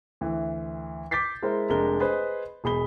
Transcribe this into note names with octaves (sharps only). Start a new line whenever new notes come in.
D2 E3
D6 G6 A6 B6 C7
G#3 E4 A#4 C5
F1 G#3 D4 A#4 G7
G#4 B4 C5 D#5
E1 G#4 B5 G7